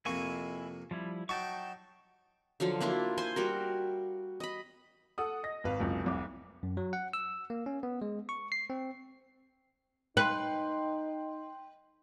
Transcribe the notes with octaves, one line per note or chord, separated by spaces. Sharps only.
F2 C3 A#3 E4 G#5 C#6
F3 G3 E4
F#3 D#4 G5 A5 C#6
D3 F3 F#3 F5
A#3 D4 E4 F4
C5 G#5 C6
G3 F#4 A#4
D#5 B5
A4 F#5 D#6
D#5 A#6
G#1 B4 F5
F#1 C#2 C3
F1 C2 D6
F#2
F#3
F#5
E6
A#3
C#4
B3
G#3
C#6
C7
C4
D#4 B4 G5 C6